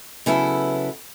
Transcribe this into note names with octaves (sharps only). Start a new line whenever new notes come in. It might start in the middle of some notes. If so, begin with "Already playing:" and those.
C#3 F#3 B3 E4 A4